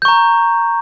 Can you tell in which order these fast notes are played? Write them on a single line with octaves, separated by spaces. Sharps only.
G6 C#6 A#5